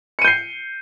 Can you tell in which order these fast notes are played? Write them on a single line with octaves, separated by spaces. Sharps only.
C#7 D#7 G6 C7